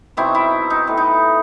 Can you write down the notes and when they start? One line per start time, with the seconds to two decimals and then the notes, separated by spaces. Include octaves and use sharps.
0.17 B2 F#3 C4 D#4 E4
0.35 E4
0.70 D#4
0.87 A2 E3 B3
0.97 D#4